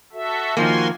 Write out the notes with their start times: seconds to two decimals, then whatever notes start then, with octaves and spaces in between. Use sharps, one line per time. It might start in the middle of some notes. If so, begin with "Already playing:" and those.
0.13 F#4 A4 E5
0.57 D#3 F3 A#3 F#4 G#5 C6